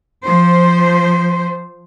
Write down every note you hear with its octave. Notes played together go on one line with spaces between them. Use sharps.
F3 C5